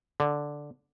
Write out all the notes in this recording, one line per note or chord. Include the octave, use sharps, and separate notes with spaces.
D3